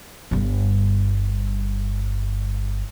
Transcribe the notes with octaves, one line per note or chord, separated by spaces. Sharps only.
G1 G2